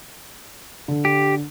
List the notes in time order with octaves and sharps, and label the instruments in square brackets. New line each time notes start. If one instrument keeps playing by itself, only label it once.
[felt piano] D3
[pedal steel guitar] G4